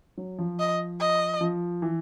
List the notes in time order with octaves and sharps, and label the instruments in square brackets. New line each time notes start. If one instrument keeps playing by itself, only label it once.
[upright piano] F#3
F3
[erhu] D#5
D#5
[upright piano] F3
E3